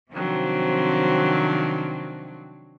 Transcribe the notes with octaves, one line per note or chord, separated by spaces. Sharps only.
C3 D#3 F3 F#3 C4 D4